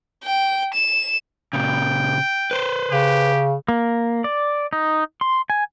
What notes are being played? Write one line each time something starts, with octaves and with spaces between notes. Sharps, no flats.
G5
E7
A#2 C#3 G5
B4 C5
C#3 G4
A#3
D5
D#4
C6
G#5